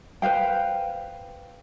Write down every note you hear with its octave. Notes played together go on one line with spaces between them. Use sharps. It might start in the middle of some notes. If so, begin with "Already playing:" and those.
B4 C5 F5 G5